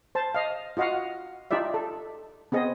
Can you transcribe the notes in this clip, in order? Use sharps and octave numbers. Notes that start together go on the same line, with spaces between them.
C5 A5
D#5 F5
F4 F#4 D#5 F5 F#5
D#4 F4 G4 D5 E5
A4
B3 C4 G#4 D#5